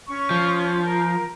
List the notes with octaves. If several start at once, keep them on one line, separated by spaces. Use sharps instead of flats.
C#4 C#6
F3
A#4